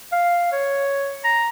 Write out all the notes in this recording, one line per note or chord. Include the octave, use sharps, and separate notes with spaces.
F5
C#5
A#5